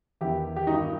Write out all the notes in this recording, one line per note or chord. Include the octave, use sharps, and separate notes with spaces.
E2 D#3 E4 G4
G4
G2 D#3 D#4 F#4